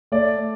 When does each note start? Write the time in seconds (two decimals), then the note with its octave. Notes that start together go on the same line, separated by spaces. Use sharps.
0.12 A3 D5